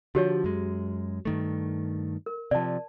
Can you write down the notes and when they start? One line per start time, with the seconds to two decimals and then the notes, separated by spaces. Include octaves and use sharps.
0.15 D3 D#3 F3 F#4 G4 C#5
0.44 F#2 G#3
1.25 G2 D#3 A3
2.26 A#4
2.51 C3 F3 D5 A5